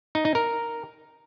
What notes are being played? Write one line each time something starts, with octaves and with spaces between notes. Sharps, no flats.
D#4
D#4
A#4